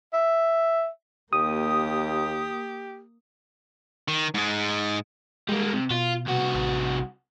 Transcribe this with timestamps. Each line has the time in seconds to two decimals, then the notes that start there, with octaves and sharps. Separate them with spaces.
0.13 E5
1.33 D#2 A#3 G4 D#6
4.08 D#3
4.34 G#2 G#3
5.49 G3 G#3 A#3
5.73 C3
5.91 B2 F4
6.26 C2 F#4
6.54 A1